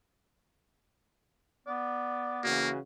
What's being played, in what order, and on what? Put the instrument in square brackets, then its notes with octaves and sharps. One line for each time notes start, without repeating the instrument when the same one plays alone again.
[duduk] B3 [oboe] D5
[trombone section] C#3 E3 F#4 [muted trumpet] A#3